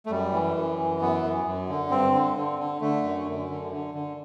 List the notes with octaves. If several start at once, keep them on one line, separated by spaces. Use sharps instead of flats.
A3
F#2 G3
E3
F#2
E3
F#2 B3
F#2
F#2
D3
G2 C4
D3
D3
D3
D3 A3
F#2
F#2
D3
D3
D3